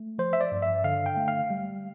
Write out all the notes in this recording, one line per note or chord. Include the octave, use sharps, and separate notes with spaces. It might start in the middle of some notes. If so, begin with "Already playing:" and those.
Already playing: A3
F3 C5
E5
D5
G2
E5
D3 F5
G5
A3
F5
G3